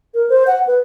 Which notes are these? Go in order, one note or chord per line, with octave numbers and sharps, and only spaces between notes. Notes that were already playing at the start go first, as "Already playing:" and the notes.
A#4
C5
F#5
B4